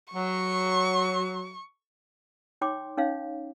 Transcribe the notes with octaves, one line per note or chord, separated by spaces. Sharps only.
F#3 C#6
D#4 C#5 G5 C6 D6
C#4 D#4 C#5 F5